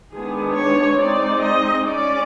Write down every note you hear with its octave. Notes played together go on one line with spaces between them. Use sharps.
D#3 G#3 B3 D4 G#4
C#5
G#3 C4 D#4 D5
D#5
G#3 C#4 D5